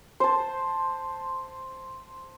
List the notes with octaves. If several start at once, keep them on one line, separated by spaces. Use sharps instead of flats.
C5 A5